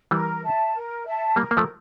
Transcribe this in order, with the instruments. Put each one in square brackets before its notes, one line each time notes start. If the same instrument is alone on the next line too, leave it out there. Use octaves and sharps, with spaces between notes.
[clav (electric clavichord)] E3 G3 [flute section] A#4
[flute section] E5 A5
A#4
E5 A5
[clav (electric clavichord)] G3 A#3 [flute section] A#4
[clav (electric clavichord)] A#3
F3 A3